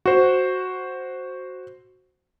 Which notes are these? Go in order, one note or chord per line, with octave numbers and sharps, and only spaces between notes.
F#4 C5